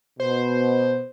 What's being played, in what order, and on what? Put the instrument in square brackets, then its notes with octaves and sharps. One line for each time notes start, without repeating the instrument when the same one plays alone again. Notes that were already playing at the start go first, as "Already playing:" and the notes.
[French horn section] B2 [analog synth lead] C5